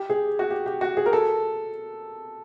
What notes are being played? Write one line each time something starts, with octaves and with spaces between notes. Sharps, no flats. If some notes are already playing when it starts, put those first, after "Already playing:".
Already playing: G4
G#4
F#4
G4
G4
F#4
G#4
A#4
A4